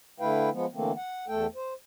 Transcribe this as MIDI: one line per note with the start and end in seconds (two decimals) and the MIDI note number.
0.20 0.50 50
0.20 0.50 57
0.20 0.50 64
0.20 0.50 71
0.20 0.50 77
0.20 0.50 79
0.52 0.66 53
0.52 0.66 56
0.52 0.66 59
0.74 0.92 50
0.74 0.92 52
0.74 0.92 57
0.74 0.92 58
0.74 0.92 60
0.96 1.25 78
1.28 1.46 40
1.28 1.46 57
1.28 1.46 69
1.28 1.46 79
1.55 1.73 72